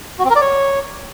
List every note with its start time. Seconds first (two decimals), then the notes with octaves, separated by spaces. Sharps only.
0.19 F#4
0.24 C4
0.30 A#4
0.36 D5
0.41 C#5